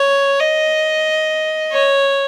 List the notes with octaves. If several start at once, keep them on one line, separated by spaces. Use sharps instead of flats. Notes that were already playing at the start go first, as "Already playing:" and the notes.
Already playing: C#5
D#5
C#5